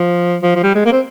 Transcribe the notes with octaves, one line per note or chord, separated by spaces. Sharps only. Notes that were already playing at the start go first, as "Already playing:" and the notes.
Already playing: F3
F3
F3
G3
G#3
A#3
C4